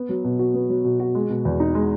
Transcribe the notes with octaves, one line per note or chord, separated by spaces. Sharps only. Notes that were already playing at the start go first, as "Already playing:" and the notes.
Already playing: B3
F#3
B2
F#4
B3
F#3
B2
F#4
G#3
B2
E2
D#4
G#3